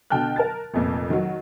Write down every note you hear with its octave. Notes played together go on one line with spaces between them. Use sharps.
B2 D3 G5 A5 F6 F#6
A#4 A5 A6
F1 F2 A#2
D#3 F#3